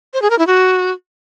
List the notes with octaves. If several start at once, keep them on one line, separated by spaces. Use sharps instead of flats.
C5
G#4
A#4
E4
F#4